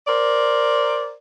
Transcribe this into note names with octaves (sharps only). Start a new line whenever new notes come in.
A#4 C5 D5